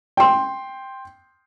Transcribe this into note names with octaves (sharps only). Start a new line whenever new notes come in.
G5 C6